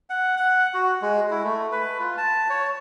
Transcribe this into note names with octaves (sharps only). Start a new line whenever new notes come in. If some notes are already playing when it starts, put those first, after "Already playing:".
F#5
F#5
F#4
G#3
E4
A3
B4
F4
A5
C#5